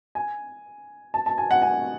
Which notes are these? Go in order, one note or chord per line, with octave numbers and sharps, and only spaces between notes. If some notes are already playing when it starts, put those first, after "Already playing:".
G#5
A5
A5
G#5
F#5
G#5